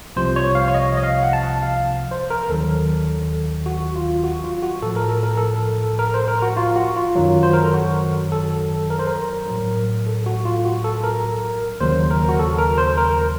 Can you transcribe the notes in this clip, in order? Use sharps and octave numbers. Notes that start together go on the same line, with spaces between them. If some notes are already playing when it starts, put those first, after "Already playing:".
C2 C3 F3 C5
C#5
F5
C#5
D#5
D#5
F5
F#5
A5
F5
C5
A#4
D#2 D#3 F#3 A4
F#4
F4
F#4
F4
F#4
A2 F3 A4
A#4
A4
A#4
A4
A#4
C5
A#4
F#4
F4
F#4
F4
F#2 D#3 F#3
C5
A#4
A4
F#4
A4
A#4
C5
A#4
A2 F#3
A4
F#4
F4
F#4
A4
A#4
D#2 C#3 F#3 C5
A#4
F#4
A4
A#4
C5
A#4